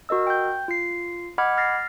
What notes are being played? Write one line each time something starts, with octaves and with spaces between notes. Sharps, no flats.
F#4 A#4 D#5 E6
G5 G6
F4 C7
D#5 F#5 B5 D6 F6 G#6
F6 A6 A#6 C7